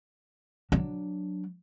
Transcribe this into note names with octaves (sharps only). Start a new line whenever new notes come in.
F#3 D4